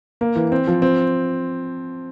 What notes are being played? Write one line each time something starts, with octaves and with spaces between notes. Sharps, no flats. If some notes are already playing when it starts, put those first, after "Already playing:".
A#3
E3
C4
F3
C4